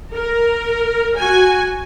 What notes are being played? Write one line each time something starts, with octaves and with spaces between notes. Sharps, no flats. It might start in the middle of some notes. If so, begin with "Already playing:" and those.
A#4
F#4 G#5